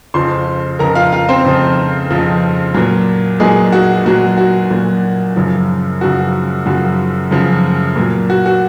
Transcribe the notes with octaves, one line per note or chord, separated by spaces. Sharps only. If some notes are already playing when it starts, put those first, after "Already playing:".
F2 C#3 F3 C5 C6
F2 C#3 F3 A#4 A#5
F4 F5
F4 F5
C4 C5
F2 C#3 F3
F2 C#3 F3
A#2 F#3
A#2 F#3 G#3 G#4
F#4
A#2 F#3 F#4
F#4
A#2 F#3
F#2 C#3 F3
F#2 C#3 F3 F#4
F#2 C#3 F3 F#4
F#2 C#3 F3
A#2 F#3
F#4
F#4